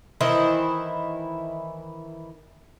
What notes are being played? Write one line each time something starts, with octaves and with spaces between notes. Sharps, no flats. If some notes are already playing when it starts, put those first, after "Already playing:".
D#3 E3 E4 C5